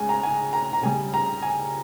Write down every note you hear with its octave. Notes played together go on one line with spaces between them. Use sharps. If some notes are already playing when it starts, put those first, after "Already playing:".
Already playing: C#3 G#3 G#5
A#5
G#5
A#5
A#5
C#3 G3 G#5
A#5
G#5